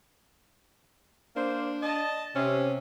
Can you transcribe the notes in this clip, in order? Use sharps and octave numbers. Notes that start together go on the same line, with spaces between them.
A#3 D4 C5
D#5 A5
C3 C#4